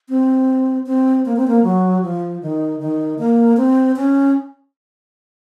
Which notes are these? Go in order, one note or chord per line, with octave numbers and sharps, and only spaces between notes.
C4
C4
A#3
C4
A#3
F#3
F3
D#3
D#3
A#3
C4
C#4